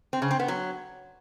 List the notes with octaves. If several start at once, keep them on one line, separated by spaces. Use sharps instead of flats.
C4
C#3
C4
B3
F#3